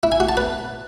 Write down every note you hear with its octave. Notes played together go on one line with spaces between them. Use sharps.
E4
G#5
F#4
A5
B4